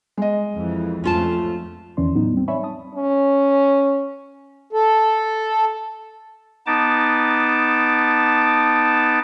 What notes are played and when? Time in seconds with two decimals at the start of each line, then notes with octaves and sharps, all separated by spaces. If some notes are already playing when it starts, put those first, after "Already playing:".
0.17 G#3 D#5
0.55 F2 E3
1.04 F2 A3 C#4 F4 A5
1.97 E2 D#3 E3 C#4 D5 C6
2.15 A2 F#3 B3 D#4
2.34 G3 C4
2.48 C#5 D5 E5 G#5 B5 C#6
2.63 A5 D#6
2.95 C#4
4.73 A4
6.66 B3 D#4 A5 D6